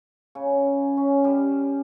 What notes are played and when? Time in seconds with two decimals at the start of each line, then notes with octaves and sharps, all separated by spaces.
0.35 C#3
0.97 C#4
1.24 G3